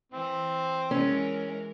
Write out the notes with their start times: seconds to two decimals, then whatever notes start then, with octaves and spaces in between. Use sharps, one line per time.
0.12 E3 C4
0.91 E3 G#3 C#4 A#4